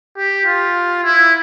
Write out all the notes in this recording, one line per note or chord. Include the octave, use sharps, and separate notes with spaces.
G4
F4
E4